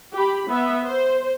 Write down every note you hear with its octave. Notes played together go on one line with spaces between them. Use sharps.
G4 B5
B3 E5
C5